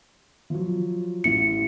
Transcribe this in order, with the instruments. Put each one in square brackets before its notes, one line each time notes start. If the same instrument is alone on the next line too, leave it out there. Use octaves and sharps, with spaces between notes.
[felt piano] F3 F#3
[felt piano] A1 A#3 E4 [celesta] C#7